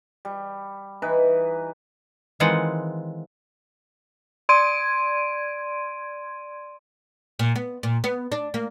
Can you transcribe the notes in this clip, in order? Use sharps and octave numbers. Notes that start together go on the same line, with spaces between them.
G3
E3 D#4 B4
D#3 E3 G#3 C4 F4 F#5
D5 C6 G#6 D7 D#7
A#2
B3
A#2
B3
D4
A#3